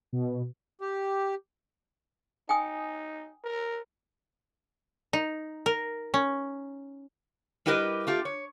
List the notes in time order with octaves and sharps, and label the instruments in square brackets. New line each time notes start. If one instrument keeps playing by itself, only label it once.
[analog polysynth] B2
[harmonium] G4
[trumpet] D#4 [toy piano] G5 G#5 D#6
[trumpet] A#4
[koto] D#4
A#4
C#4
[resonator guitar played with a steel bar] G3 E4 G4 A#4 B4 D#5
A3 F4 G4
C#5